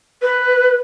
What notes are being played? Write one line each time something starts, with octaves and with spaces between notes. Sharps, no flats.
B4